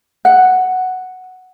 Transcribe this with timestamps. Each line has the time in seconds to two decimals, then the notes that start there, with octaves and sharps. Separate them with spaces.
0.25 F#5